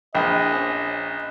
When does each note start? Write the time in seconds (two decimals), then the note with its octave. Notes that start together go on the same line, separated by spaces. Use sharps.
0.15 A#1 E4 D#5 G5
0.51 C#4 C5 G#5